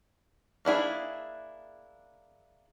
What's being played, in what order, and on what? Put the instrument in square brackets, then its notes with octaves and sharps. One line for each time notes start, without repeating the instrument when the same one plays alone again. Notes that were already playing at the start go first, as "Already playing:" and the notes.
[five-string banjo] A#3 D4 E4 G#4